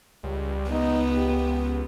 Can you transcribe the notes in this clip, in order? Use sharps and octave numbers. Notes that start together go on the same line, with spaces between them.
C#2 G3
B3 D#4
G4